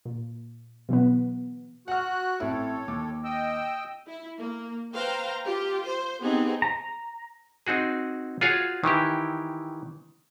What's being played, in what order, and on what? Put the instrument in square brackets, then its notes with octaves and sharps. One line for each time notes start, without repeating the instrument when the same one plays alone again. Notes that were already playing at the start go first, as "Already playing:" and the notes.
[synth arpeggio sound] A#2
B2 E3 F#3 B3
[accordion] F#4 F#6 [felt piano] F#5 F6
[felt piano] A1 C4 E4 [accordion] A4 C#5
[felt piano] D#2 D6
[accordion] D#5 G5 E6
[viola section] E4
A#3
B4 C5 F5 G5 A#5
F4 G4
C5
B3 C4 D#4 G4 G#4
[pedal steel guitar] A#5
[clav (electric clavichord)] C4 D#4 F#4 G#4
F4 F#4 G#4 C#5 F5
D#3 E3 E4 G4